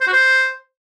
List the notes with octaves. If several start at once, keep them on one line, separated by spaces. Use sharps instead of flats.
C5
F#4
C5